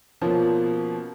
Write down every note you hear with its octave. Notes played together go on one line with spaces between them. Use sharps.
B2 F3 A#3 C#4 F4